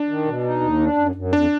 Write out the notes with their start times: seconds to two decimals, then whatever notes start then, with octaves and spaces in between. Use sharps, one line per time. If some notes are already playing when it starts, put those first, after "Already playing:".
Already playing: D4
0.08 D#3
0.25 B2
0.44 D#4
0.61 D#2
0.80 D4
0.97 F#2
1.15 F#2
1.33 F2 D4